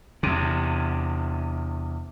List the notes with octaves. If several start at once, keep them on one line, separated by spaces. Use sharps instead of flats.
E2 C3